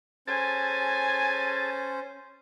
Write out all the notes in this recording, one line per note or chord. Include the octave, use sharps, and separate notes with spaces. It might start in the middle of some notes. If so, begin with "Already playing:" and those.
C#4 G#4 A4 C5 G#5 A5